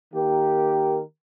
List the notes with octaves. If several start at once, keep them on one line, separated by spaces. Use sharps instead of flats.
D#3 A#3 G4 A#4